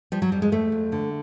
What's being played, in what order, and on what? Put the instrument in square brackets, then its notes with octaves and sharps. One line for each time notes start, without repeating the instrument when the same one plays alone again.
[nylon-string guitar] F3 G3
F#3
F2 G3
G#3
F2 A3
F2
D3